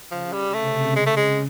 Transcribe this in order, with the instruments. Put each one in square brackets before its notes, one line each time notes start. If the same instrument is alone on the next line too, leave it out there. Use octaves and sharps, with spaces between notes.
[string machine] C#3 [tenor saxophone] F3
[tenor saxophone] G3
[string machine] C3 [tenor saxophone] A3
[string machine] C#3 [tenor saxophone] G#3
[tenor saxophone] A3
G#3